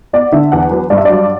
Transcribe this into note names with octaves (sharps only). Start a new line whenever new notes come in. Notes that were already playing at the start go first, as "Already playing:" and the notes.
B3 D5
D3 E5
E2 F#5
F#3 B4
G2 D5
E5
F#3 D5